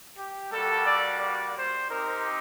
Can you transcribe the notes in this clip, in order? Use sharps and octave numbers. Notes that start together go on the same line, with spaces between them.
G4
G3 A#3 F#4 A4
D5
D5
C5
C4 D#4 G4 A#4